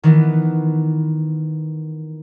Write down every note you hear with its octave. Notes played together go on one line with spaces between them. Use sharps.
D#3 E3 B3